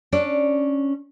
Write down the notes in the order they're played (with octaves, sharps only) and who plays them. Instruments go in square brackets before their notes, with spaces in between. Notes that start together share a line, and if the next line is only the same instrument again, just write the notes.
[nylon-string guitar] C#4 D4 D5